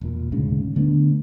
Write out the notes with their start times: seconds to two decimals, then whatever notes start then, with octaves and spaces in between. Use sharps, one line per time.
0.01 E1 A#2
0.32 D#1 D2 G#2 C#3
0.76 D3 A3 B3 D4